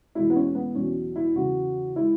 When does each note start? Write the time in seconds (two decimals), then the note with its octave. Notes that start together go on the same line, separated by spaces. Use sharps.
0.15 E2 B2 G#3 E4
0.30 B3
0.36 C#4
0.55 B3
0.75 E2 B2 F#3 C#4
1.16 E4
1.35 E2 C#3 E3 F#4
1.96 G#3 E4